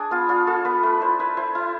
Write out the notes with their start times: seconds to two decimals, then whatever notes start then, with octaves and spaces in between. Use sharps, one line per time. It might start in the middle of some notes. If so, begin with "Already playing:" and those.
Already playing: D4 G#4 D5
0.11 B3 F4
0.29 D4 F4
0.47 F4 A4
0.65 B3 B4
0.83 A3 B4
1.01 E4 C5
1.19 E4 B4
1.37 E4 C5
1.55 E4